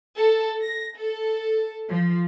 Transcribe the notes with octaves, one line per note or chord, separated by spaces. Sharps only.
A4
A#6
A4
F3